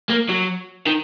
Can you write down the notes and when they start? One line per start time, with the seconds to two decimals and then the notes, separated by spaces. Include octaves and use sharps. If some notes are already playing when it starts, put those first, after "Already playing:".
0.10 A#3
0.29 F#3
0.87 D#3